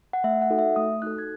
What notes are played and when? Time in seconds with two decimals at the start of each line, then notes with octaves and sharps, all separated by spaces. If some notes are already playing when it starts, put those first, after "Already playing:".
0.13 F#5
0.24 A3 E5
0.42 F#5
0.50 D#4 F#4 A4
0.59 E5
0.76 A3 D#6
1.02 D#4 F#4 A4 F#6
1.18 G#6